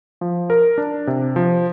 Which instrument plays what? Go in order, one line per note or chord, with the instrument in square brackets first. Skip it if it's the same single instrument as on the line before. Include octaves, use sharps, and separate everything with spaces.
[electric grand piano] F3
A#4
D4
C3
F3